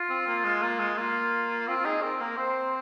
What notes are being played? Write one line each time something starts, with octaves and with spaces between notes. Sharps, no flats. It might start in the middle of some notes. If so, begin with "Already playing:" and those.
Already playing: F4
C4
A#3
G#3
A#3
G#3
A#3 F4
C4 F4
F4
D#4 G#4
C4 A#4
A#3 A#4
C4 C5